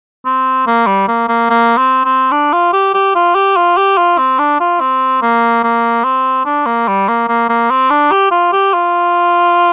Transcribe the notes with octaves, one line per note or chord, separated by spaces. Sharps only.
C4
A#3
G3
A#3
A#3
A#3
C4
C4
D4
F4
G4
G4
F4
G4
F4
G4
F4
C4
D4
F4
C4
A#3
A#3
C4
D4
A#3
G3
A#3
A#3
A#3
C4
D4
G4
F4
G4
F4